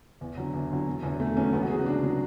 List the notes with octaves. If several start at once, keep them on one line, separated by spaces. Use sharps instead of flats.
E2
D3 F#3
E2
D3 F#3
E1
E2 D3 F#3
E1 A3
E2 D3 F#3 C#4
C#2 B3
F#4
C#3 F#3 G#4
F#4
C#2 D4
C#3 F#3